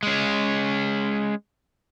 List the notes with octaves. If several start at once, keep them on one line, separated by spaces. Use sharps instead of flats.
G#3 C#4